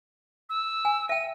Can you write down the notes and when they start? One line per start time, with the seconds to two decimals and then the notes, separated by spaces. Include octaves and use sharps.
0.50 E6
0.85 G#5
1.09 E5 G5 D#7